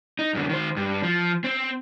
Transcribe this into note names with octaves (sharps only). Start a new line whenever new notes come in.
D#4
F#2 D3
D#3 C5
G2
F3
C4